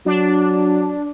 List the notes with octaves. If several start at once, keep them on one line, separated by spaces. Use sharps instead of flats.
F#3 D4